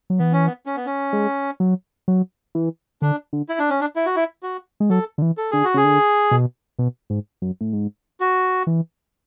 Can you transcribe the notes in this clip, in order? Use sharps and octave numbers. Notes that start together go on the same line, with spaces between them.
F#3
E3 B3
C#4
B3
C#4
B3
C#4
G#3
F#3
F#3
E3
D3 D4
D3
E4
D4
C#4
D4
E4
F#4
E4
F#4
G#3
F#3 A4
D3
E3
A4
D3 G#4
F#4
C#3 G#4
D3
B2
B2
G#2
F#2
A2
G#2
F#4
E3